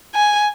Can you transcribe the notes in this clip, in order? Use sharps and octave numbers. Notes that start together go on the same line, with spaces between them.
G#5